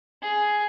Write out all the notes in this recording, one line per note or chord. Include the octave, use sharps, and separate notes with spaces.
G#4